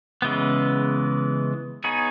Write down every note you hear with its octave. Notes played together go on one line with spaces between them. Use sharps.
C#3 E3 G#3 B3
B3 D#4 G#4 C#5